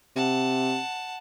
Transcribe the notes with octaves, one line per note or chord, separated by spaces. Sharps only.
C3 F#5 A5